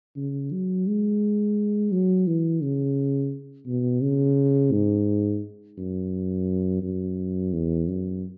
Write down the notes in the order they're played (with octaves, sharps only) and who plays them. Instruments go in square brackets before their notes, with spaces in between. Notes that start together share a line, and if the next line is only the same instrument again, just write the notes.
[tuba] C#3
F#3
G#3
F#3
E3
C#3
B2
C#3
G#2
F#2
F#2
E2
F#2